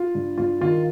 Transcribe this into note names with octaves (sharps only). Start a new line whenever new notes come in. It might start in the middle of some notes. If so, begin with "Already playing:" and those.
Already playing: F4
G2
G2 F4
D#3 F4